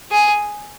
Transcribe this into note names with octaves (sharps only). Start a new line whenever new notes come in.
G#4